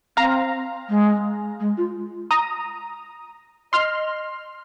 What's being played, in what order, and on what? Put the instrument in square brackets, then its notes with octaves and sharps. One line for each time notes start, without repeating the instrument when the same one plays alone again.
[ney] C4 [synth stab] F5 A#5
[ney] G#3
G#3
F4
[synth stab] A#5 D#6
[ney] D#5 [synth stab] C6 F6